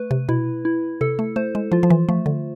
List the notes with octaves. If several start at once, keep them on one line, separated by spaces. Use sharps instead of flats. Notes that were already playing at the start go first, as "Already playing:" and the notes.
Already playing: A3 B4
C3
B2 E4
E4
C3 A4
A3
A3 C5
G#3
F3 F4
F3
E3
F3 A3
D3